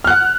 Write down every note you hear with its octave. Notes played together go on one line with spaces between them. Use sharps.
F#5 F6 F#6